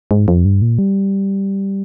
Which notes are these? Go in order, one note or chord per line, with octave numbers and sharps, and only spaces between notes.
G#2
F2
G2
A#2
G3